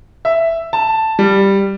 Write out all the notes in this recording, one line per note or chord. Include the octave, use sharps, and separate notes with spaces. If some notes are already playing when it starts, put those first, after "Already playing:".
E5
A5
G3